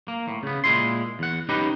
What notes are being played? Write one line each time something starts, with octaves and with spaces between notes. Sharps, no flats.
A#3
A2
C#3 B3
A#2 G#3 E4 C6
E2 F#5
C#4 D#4 G4 B4